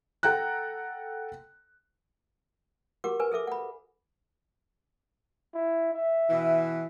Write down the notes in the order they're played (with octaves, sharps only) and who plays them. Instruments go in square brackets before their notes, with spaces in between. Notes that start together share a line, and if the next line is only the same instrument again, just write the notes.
[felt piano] A4 F#5 G5 A#5 F#6
[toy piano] F#4 G4 A#4 F#5 D6
A#4 B4 G#5
G#4 A4 E5 D6
F#5 B5
[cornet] E4
E5
[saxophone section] B2 E3